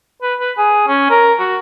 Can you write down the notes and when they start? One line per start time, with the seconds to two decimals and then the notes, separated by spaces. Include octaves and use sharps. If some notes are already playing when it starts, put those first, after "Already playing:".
0.22 B4
0.40 B4
0.58 G#4
0.88 C#4
1.11 A#4
1.39 F#4